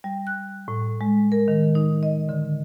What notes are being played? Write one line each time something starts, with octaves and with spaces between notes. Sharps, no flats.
G3
F#6
A2
G#3
A#4
D#3
D#4
D#5
D3